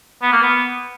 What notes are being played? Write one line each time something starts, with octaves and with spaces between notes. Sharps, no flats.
B3
A#3
B3